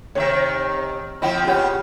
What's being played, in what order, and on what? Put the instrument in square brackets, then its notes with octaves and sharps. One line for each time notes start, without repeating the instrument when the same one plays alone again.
[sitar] C3 D#3 E5 [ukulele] C#5
[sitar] F3 C4 E4 [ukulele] D#5 F#5 G5
[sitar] C#3 B3 [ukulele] F4 G4 C#5